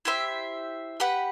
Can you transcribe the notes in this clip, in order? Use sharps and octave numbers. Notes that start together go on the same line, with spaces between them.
E4 G4 C5 E5
G4 B4 F#5